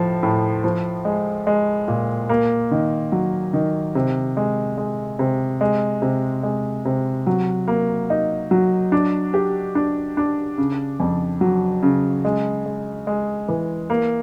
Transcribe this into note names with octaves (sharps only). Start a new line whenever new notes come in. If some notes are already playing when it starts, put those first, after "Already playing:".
Already playing: A2 F3
A2
F3
G#3
G#3
A#2
A#3
D#3
F#3
D#3
C3
G#3
G#3
C3
G#3
C3
G#3
C3
F#3
A#3
D#4
F#3
D4
G4
D4
D4
C#3
F2
F#3
C#3
G#3
G#3
G#3
E3
A#3